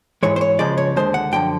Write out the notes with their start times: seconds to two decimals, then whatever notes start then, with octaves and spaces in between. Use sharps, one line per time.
0.23 G#2 E3 G#3 C#5
0.36 C5
0.41 C#5
0.59 C#2 C#3 F3 G#3 D5
0.78 C#5
0.96 D#2 D3 F3 G#3 C5
1.14 F#5
1.32 F#2 D3 F3 G5